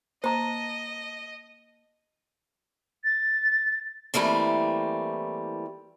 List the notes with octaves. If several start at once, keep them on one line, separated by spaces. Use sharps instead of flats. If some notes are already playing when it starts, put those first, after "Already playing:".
A#3 C5 D#5 A5 A#5
A6
E3 G3 A3 A#3 C4